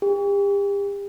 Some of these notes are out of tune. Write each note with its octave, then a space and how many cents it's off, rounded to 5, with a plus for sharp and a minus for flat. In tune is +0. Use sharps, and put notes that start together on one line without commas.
G4 +40